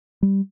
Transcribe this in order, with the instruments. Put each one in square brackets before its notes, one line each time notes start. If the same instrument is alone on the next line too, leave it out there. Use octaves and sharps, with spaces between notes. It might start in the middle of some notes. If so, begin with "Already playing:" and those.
[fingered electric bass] G3